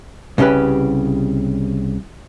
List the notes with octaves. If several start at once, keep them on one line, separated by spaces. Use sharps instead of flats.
C2 C#3 C#4 G4 B4